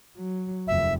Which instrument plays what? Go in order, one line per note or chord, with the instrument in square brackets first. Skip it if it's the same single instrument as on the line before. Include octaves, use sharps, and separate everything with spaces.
[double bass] F#3
[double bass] F1 D#2 [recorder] E5